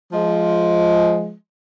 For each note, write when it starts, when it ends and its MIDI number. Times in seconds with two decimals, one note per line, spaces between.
0.13 1.34 53
0.13 1.34 56